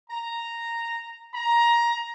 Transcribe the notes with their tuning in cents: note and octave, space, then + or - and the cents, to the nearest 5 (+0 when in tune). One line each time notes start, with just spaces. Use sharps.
A#5 -5
A#5 +15